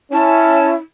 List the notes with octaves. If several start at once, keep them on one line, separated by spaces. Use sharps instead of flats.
C#4 E4 A5